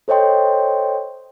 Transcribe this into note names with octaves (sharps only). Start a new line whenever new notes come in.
A4 C5 C#5 D#5 G5 C6